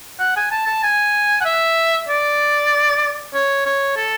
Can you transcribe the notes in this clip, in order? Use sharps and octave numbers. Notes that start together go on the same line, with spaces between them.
F#5
G#5
A5
A5
G#5
F#5
E5
D5
C#5
C#5
A4